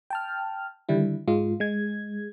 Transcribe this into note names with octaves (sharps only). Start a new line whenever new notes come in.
G5 A5 F6
D3 D#3 G3 E4
G#2 G#3 F4
G#3 G#6